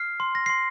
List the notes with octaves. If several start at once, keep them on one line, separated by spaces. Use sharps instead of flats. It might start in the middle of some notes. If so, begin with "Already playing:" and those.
Already playing: F6 C7
C6
A#6
C6 C7